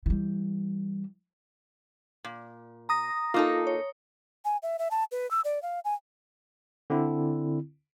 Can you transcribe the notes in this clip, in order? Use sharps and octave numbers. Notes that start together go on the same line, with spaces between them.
E3 G3
A#2
A#5 D#6 A#6
A#3 D#4 F4 A4
C#5
G#5
E5
E5
A5
B4
E6
D5
F5
G#5
D3 C4 E4